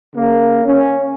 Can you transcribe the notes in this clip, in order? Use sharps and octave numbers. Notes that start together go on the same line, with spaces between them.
C#3 A#3
C#4